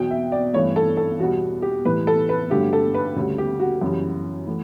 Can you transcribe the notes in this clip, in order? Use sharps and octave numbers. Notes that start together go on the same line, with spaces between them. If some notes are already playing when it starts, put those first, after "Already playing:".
Already playing: E2 B2 F#3 G5
E5
D5
G2 E3 A3 C#5
A4
A4
E2 B2 G3 F#4
G4
A2 E3 G3 B4
A4
B4
G2 D3 F#3 A3 G4
A4
B4
D2 C#3 G3
G4
F#4
F#2 C#3 E3 G3
E3 A3